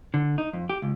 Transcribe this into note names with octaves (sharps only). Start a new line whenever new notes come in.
D3
D#4
F2
G4
C#2